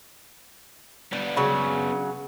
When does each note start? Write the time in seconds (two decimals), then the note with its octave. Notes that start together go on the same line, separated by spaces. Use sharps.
1.13 G3 B3 D4
1.37 C#3 F#3